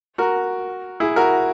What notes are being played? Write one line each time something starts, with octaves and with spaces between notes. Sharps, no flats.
F#4 A#4
E4 G#4
F#4 A#4